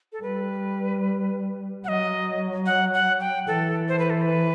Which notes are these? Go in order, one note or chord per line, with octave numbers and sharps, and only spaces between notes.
A4
G3 B4
F#3 D#5 F#5
F#5
F#5
G5
E3 A4
C5
B4
A4
B4